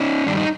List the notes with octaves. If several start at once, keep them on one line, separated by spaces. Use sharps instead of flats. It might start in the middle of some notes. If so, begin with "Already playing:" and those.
Already playing: C#4 D#4
G2 D#3 G3 D4
D#4